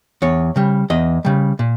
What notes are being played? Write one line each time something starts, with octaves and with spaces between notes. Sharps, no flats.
E2 C#5
C#3 G3
E2 D#5
C#3 G3
A#2